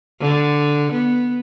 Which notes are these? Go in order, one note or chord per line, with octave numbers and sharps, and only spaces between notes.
D3
B3